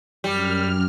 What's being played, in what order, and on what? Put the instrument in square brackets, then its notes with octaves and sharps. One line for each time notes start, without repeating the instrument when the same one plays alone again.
[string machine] F#2 F6 [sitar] G3